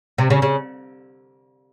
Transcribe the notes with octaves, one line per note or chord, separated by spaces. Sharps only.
C3
C#3
C#3